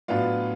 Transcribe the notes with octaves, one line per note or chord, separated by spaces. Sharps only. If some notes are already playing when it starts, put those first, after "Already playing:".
A2 F#3 B3 D4 F4